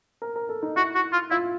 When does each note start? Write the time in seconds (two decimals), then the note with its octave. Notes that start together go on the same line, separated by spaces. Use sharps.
0.22 A#4
0.36 A#4
0.49 A4
0.62 D#4
0.76 E4 F#4
0.95 F#4
1.12 F4
1.31 E4 F4